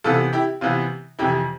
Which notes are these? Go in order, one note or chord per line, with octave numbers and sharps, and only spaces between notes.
C3 E3 B3 F4 A4
E4 G4
C3 E3 B3 F4
F2 C3 E3 E4 G4